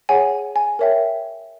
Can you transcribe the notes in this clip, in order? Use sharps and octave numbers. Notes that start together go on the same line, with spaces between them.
G#4 C#5 F#5 G#5
G#5
A#4 C#5 E5 G5